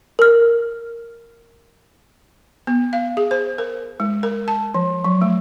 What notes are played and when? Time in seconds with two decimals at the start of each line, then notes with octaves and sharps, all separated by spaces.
0.19 A#4 F6
2.67 B3
2.93 F5
3.17 G#4
3.31 C5
3.58 A#4
4.00 G#3
4.23 A#4
4.48 A5
4.74 F3
5.04 F#3
5.22 A3